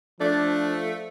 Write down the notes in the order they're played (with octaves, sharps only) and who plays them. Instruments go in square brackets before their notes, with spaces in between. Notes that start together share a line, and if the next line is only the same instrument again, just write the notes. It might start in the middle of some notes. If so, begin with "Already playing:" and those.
[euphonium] F3 [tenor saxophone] A3 [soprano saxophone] D4